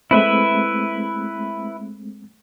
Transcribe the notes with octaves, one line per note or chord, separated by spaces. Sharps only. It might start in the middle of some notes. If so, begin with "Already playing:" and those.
G#3 A3 C4 E4 B4 E5